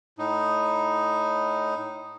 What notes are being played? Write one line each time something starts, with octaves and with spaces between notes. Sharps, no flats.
A2 D#4